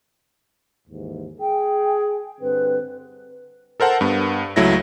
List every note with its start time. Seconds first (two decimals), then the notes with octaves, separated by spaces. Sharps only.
0.88 D#2 G#2 E3
1.41 G#4 G5
2.41 G2 D3 C4 B4
3.80 A4 A#4 C5 F#5 A5
4.01 G2 B3
4.56 C#2 F#3 A3 E4 A#6